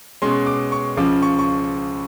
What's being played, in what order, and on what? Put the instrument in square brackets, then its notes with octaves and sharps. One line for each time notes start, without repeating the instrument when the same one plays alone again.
[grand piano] B2 G#3 C#4 C6
D6
C#6
C#2 C#3 F3 D6
C#6
C#6